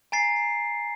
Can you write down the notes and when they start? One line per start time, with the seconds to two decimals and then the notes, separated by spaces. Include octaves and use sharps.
0.12 G#5 A#5 A6 C7